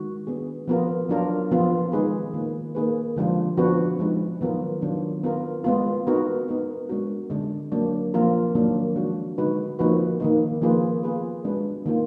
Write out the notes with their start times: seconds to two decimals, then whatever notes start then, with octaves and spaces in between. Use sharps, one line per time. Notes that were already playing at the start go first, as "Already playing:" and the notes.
Already playing: D#3 G#3 F#4
0.27 B3 D4 G#4
0.68 F3 B3 F4 A#4
1.09 F#3 D4 F4 A#4
1.51 F3 B3 F4
1.92 D#3 G#3 D#4 G#4 B4
2.33 D#3 A#3 F4
2.75 A#3 D#4 G#4 B4
3.16 D3 F3 G#3 D4 F4
3.57 F3 B3 D4 F#4 B4
3.99 F3 G#3 D#4
4.41 D#3 F#3 B3 F4 A#4
4.82 D#3 F#3 D4 F4
5.23 B3 F4 A#4
5.64 G#3 B3 F4
6.07 B3 D#4 F#4 A#4
6.48 B3 D#4 A#4
6.89 G#3 D4 F#4 A#4
7.30 D3 G#3 D4
7.72 F#3 A#3 D4
8.14 F3 A#3 F4 A#4
8.55 D#3 F#3 A#3 D4
8.96 F3 G#3 D4 F#4
9.38 D3 G#3 D#4 F#4 B4
9.79 F3 A#3 D#4 F#4 B4
10.20 D#3 A#3 D#4
10.62 F3 A#3 F4 G#4 B4
11.03 B3 F4 G#4 B4
11.45 G#3 D4 F#4 B4
11.86 D#3 A#3 F4